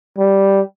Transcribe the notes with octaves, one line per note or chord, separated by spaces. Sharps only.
G3